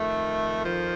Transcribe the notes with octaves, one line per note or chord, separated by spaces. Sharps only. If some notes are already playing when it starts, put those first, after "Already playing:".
Already playing: F2 D#3 A3
F3